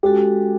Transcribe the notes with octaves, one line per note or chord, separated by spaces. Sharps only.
G#3 C#4 F#4 G4 A4